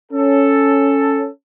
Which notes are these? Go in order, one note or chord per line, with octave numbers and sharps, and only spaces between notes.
C#4 A4